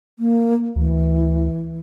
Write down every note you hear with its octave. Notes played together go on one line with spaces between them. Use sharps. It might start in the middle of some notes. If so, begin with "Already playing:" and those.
A#3
D2 E3